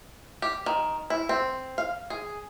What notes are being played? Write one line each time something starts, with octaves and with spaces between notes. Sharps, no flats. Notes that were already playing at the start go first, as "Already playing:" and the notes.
G4
D#3
E4
C4
F5
G#4